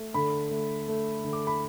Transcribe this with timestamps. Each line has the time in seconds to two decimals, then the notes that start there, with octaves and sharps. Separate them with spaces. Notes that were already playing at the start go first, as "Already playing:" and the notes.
Already playing: A3
0.14 D3 B5
0.51 A3
0.88 A3
1.24 D3
1.33 D6
1.47 B5